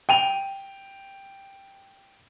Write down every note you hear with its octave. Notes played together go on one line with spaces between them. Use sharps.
G5 D#7 F7